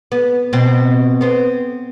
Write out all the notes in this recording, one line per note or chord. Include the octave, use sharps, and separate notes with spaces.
B3
B2 C4
B3 C4